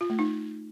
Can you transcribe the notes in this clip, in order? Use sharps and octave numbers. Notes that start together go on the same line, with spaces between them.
F4
A3
D#4